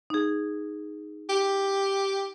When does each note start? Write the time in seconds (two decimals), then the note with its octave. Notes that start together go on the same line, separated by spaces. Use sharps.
0.10 D#4 G#4
1.29 G4